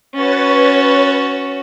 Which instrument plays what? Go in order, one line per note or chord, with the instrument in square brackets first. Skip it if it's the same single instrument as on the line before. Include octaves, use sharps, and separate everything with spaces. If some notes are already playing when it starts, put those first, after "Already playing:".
[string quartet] C#4 F#4 [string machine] B4 C#5 A6